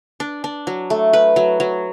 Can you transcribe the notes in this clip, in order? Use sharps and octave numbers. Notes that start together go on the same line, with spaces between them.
D4
D4
F#3
A3
B4
F#3
F#3